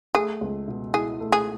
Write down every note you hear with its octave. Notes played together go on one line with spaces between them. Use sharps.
A3 G#4
C#2
B2
E4 G#4
A3
G#4